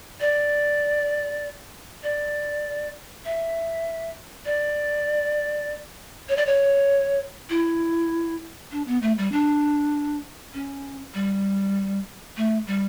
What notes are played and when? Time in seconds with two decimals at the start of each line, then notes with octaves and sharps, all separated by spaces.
0.20 D5
2.03 D5
3.25 E5
4.46 D5
6.29 C#5
6.37 D5
6.47 C#5
7.50 E4
8.72 D4
8.87 B3
9.02 A3
9.18 G3
9.32 D4
10.54 C#4
11.14 G3
12.37 A3
12.67 G3